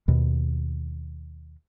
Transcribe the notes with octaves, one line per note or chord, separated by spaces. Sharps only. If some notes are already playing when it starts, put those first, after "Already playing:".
D#2 B2 D#3